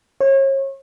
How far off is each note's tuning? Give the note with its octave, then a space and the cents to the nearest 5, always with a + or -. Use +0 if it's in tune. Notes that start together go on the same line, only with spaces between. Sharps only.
C#5 -35